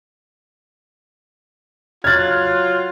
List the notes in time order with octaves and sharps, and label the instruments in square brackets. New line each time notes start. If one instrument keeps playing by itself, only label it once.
[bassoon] F#3 [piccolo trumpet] F4 [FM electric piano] F6 F#6 [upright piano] G#6 A6